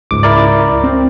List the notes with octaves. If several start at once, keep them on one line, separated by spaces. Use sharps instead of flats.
C#2 G#2 D6
E4 A#4 D5
C4